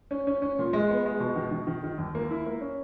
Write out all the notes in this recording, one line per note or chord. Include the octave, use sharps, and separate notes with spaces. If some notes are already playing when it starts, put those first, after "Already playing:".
C#4
C#4
C#4
A#2
G#3
B3
G#3
B2
D#3
D#3
D#3
D#3
D#2
A#3
E4
A#3
C#4